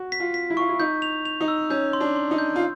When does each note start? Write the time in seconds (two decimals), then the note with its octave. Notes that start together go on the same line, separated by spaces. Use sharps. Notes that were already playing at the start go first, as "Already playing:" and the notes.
Already playing: F#4
0.12 B6
0.20 F4
0.34 B6
0.50 E4
0.57 F4 C#6
0.69 E4
0.80 D#4 G6
1.02 F7
1.25 F7
1.41 D#4
1.48 E6
1.70 C#4 G6
1.93 C6
2.00 D4
2.16 C6
2.31 D#4
2.38 G6
2.56 F4